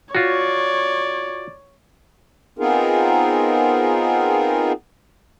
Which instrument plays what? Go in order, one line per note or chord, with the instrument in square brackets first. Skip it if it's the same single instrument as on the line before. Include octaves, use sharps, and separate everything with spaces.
[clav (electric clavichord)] F4 F#4 [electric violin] C#5 [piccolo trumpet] D5
[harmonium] B3 C4 D#4 F4 G#4 A#4